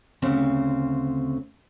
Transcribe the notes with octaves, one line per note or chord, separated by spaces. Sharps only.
D2 C#3 C4